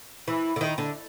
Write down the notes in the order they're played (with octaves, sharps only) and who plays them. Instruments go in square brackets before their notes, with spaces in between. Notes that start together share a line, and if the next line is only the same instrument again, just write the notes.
[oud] E3
D3
D#3
D3